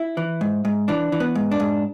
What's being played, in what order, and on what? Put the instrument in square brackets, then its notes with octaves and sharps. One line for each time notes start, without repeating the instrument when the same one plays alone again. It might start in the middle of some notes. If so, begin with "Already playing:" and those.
Already playing: [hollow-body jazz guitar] E4
E3
G#2
G#2
E3 D4
E3
B3
G#2
D4
G#2